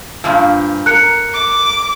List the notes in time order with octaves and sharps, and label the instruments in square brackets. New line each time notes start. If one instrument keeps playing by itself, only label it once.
[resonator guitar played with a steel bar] G2 A#2 F3
[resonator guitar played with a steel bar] A#4 [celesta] F#6 C#7
[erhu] D6